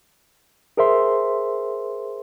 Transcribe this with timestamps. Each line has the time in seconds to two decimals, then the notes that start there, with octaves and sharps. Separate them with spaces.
0.77 G#4 A#4 C5 E5 C6